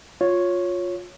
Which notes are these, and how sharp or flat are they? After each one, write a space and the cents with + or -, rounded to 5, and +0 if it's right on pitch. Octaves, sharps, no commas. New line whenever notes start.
F4 +15 C#5 +0